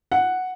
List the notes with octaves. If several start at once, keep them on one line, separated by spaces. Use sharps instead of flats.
F#5